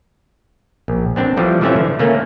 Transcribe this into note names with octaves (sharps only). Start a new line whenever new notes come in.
A#1
B3 C4 D4
E3 F3 G3 A3
E3 F3 A3 C4 C#4 E5
D3
A3 A#3 C#4